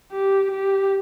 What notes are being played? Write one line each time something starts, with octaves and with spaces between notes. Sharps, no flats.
G4
G4